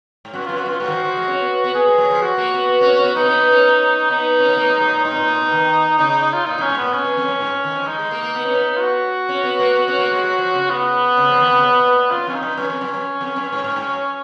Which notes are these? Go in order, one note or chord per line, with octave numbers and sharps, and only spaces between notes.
G#2
F#2 F#4
F#2 F4
F#4
F#2 F4
G#2 F#4
D#3
F3
F3
G#3
C#4
B3
B3
B3 G#4
G#3
F#3
F3
F#4
A#3
B3
B3
C#4
C#4
B3
B3 D#4
C#4
B3
B3
C#4
B3 D#4
C#4
B3
A#3
G#3
F#3
A#2
G#2 D#4
B2
A#2
A#2
B2
D#3
C#3 D#4
D#4
D#4
F4
A#2 D#4
F#2
C#4
G#2
A#2 B3
B2 C#4
F#2
F2
F#2
G#2
D#3
F3
G#3 D#4
G#3
A#3
A#3
B3
C#4
B3
F4
F#4
C#4
B3
A#3
B3
C#4
A#3
G#3
F#3
F3
C#3
B3
C#3
F3
C#3
D#3
C#3
B2
A#2
F#2 F4
F2 C#4
D#4
F#2
F#2 C#4
F2
F#2
F#2
F2
F#2
G#2
G#2
G#2
F#3